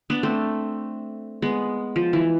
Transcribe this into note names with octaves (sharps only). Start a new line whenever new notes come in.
B3 D4
A3 C4
G#3 B3
F3
E3